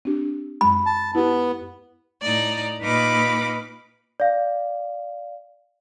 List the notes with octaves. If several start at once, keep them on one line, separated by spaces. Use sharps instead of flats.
C4 D4 G4
F#2 G#3 B5
A5
B3 E4 G4
A2 D#4 D5
A#2 D#4 B4 F5 B5 D6
D5 F5